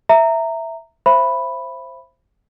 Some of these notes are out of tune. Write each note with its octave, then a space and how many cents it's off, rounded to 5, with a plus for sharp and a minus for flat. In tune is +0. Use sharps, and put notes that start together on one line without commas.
E5 +0 A#5 -15
C5 +10 E5 +30 B5 +0